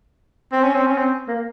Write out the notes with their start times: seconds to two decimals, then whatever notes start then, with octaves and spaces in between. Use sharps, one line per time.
0.52 C4
0.64 C#4
0.74 C4
0.87 C#4
0.98 C4
1.28 A#3